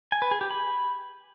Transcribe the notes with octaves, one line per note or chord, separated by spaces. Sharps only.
G#5
B4
G#4
G4
B5